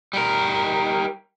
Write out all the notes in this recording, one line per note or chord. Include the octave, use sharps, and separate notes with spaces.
G3 A#4